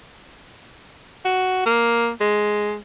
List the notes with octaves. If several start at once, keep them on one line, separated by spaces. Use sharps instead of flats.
F#4
A#3
G#3